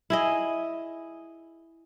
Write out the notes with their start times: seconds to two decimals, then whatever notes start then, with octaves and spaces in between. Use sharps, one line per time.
0.10 E4 G#4 D#5